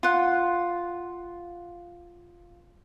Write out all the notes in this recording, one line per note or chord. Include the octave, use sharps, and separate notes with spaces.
F4 F#5